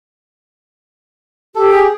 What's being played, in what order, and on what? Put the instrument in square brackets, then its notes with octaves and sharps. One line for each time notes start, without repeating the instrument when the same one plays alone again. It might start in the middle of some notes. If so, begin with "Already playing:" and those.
[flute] G4 [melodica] A4
[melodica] G#4